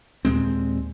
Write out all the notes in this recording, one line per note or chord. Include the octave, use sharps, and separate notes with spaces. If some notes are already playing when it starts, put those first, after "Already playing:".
D#2 A#2 G#3 C4